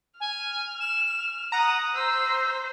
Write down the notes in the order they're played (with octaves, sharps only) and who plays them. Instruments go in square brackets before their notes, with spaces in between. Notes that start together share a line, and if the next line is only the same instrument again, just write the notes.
[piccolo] G#5 [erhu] F6
[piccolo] E7
[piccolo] F#5 [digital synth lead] A#5 [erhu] D#6
[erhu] C5 [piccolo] E6